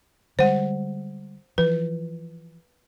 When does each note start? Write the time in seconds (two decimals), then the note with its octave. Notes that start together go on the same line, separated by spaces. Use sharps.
0.39 D3 G3 G#3 C5 F#5
1.58 E3 F3 B4